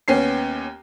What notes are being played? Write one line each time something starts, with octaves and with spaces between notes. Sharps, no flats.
D#2 B3 C#4 C7